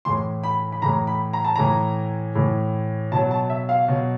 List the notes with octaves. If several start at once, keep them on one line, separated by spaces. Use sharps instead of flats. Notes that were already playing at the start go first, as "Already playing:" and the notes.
A2 E3 C6
B5
B5
A2 E3 A#5
B5
A#5
A5
A2 E3 A#5
A2 E3
B2 F#3 A5
A5
E5
F5
B2 F#3